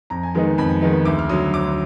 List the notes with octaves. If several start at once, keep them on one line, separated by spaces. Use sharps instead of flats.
F2 A#5
G#5
D#3 G#3 B3 D#4 A#5
F2 B5
D#3 G#3 B3 D#4
D2 D6
F6
D3 F#3 D#6
D2 D6